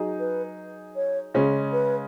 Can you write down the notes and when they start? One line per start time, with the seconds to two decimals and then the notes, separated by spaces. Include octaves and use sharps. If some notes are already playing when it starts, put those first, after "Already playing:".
Already playing: F#3 D#4 G#4
0.19 B4
0.96 C#5
1.34 C#3 G#3 C#4
1.72 B4